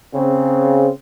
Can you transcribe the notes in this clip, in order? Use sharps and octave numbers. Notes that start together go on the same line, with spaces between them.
C#3 C4